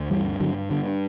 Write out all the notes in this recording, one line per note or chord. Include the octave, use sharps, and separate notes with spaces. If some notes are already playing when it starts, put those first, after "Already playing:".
Already playing: D2
G2 E3 G3
G2 D3 F#3
G2 D3